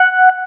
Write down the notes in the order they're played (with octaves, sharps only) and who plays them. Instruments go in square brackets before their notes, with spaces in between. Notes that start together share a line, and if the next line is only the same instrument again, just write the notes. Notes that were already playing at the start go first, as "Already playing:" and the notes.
Already playing: [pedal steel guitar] F#5